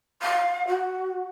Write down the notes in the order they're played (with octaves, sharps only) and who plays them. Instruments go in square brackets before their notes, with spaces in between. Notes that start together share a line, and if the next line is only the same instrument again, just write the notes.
[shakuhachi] F5
F#4